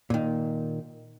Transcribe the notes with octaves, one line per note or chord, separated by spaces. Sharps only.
A#2 D#3